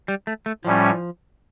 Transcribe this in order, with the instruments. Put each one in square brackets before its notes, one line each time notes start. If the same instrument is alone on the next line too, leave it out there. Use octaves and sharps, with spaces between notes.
[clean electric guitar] G3
A3
A3
[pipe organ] A2 G3 C#4 [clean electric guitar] F3